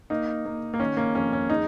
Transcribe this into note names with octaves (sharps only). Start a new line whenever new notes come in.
A#3 D#4
A#3
A#3
D#3 C#4
A#3
F2 C#4
C#4
G#3 D#4